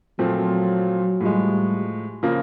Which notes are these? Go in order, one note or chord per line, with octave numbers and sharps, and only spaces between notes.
A#2 F3 F#3 A3 C4
A2 F3 G3 G#3
C#3 F3 A#3